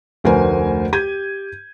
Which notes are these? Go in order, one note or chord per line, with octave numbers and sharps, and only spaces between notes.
F1 D2 A#4 C5 G#5
G4 G6 G#6 D#7